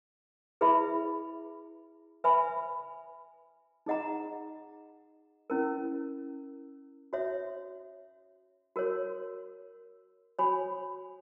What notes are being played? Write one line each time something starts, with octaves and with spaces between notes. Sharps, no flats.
E4 G#4 B4 E5 B5
B4 E5 G#5 B5
D#4 G#4 D#5 F#5 A#5
C#4 E4 A#4
F#4 C#5 E5
F#4 A#4 C#5
F#4 C#5 G#5 B5